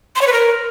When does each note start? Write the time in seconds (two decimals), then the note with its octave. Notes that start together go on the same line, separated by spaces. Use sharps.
0.16 C6
0.21 C#5
0.27 B4
0.33 A#4